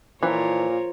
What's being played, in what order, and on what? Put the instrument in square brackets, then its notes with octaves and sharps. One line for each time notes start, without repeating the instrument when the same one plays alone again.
[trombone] A#2 [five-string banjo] E3 [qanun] F3 [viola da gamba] F4 A#4 C#5